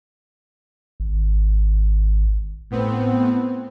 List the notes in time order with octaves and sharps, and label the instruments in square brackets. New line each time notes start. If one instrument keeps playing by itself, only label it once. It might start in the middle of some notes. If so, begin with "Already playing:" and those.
[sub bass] G#1
[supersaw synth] A2 B3 C4